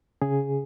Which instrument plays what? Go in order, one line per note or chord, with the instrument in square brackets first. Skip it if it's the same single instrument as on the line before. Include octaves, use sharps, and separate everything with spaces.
[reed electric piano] C#3 G#4